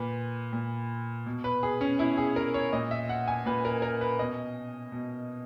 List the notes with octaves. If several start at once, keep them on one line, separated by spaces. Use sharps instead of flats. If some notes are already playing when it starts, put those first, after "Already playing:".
Already playing: A#2 B4
A#2
B2
B4
G#4
C#4
B2 E4
G#4
A#4
C#5
A#2 D#5
E5
F#5
G#5
A#2 B4
A#4
A#4
B4
B2 D#5
B2